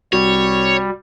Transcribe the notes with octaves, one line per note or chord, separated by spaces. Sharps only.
C2 G3 F#4 C#5